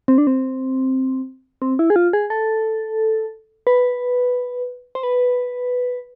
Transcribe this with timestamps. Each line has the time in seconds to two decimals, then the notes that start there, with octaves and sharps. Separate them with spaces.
0.08 C4
0.18 D4
0.27 C4
1.62 C4
1.79 E4
1.90 G#4
1.96 F4
2.13 G#4
2.30 A4
3.67 B4
4.95 C5
5.03 B4